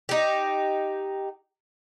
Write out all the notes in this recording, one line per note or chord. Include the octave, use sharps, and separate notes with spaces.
D#4 G4